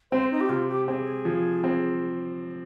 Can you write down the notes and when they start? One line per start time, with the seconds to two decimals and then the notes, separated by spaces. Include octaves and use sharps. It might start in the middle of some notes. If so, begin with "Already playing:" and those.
0.11 C4 C5
0.31 D#4
0.41 G4
0.49 C3 F4
0.68 G4
0.88 C4 G#4
1.25 F3
1.64 C4